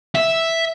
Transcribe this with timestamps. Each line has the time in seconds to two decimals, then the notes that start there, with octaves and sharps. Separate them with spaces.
0.15 E5